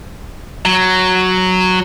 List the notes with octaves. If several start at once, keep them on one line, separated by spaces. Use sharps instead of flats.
F#3